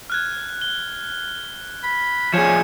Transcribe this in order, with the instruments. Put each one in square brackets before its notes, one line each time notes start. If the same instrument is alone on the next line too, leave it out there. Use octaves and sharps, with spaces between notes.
[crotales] F6 F#6 G#6
G7
[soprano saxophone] B5
[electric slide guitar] F3 G#4 [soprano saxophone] C#4 [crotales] G#6 C#7 E7